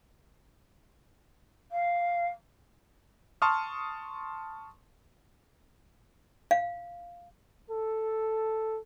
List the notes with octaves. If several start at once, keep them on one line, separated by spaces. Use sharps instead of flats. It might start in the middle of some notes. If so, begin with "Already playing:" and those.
F5
A5 C6 C#6 D#6 F6
F5
A4